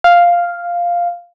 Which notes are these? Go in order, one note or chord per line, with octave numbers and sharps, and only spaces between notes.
F5